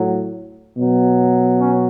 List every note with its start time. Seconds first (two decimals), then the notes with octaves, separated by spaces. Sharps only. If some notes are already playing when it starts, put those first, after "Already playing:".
Already playing: A2 F#3
0.78 B2 F#3
1.59 C#4